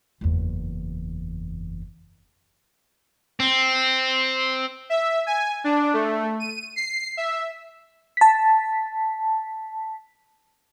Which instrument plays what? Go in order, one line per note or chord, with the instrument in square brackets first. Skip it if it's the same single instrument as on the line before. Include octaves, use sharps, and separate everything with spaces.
[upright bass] F#1 E2
[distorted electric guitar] C4
[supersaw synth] E5
G#5
D4
A3
D#7
C7
E5
[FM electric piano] A5 B6